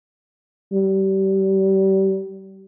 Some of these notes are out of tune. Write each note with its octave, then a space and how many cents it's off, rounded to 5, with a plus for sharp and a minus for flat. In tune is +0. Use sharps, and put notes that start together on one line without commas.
G3 -30